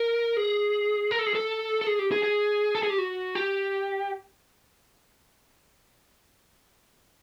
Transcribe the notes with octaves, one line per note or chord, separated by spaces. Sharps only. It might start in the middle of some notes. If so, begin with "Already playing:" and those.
Already playing: A#4
G#4
A#4
A4
G#4
A4
A4
G#4
G4
G#4
G#4
A4
G#4
G4
F#4
G4